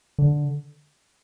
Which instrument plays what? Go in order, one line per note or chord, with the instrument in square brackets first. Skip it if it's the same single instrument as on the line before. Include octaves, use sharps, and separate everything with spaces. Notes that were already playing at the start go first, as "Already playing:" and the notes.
[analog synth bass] D3